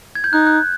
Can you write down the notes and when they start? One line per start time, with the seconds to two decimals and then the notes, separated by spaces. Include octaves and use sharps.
0.15 G#6
0.24 G6
0.33 D#4 F#6
0.47 F#6